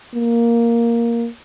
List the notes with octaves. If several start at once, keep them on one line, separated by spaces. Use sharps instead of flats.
A#3